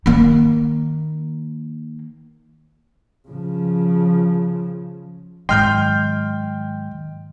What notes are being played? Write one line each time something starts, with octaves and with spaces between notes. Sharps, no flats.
D#3 A#3
C#3 F3
G#2 D#3 F#3 D#5 G5 C6 F6 G6